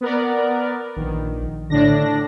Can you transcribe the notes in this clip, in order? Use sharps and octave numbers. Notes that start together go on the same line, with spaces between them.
B3 A#4 D5
A#1 D#3
A2 D3 D4 A#6